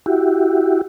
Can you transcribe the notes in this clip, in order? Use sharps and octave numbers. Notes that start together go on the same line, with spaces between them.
E4 F#4 G4